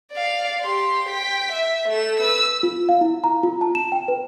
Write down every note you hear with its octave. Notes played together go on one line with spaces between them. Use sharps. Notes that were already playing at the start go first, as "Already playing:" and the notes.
D5 F5
G4 C6
G5 B6
E5
A3 E7
B4 E6
F4
F5
E4
A#5
F4
A5
E7
G5
B4